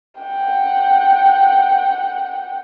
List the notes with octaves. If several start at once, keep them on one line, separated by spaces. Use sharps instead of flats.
F#5 G5